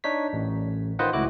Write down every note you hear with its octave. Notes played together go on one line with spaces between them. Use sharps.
D4 D#4 C#5 B6
A1
D#3 F4 B4 C5 D#5 F#5
C#2 A2 E4 F#4 D6 F#6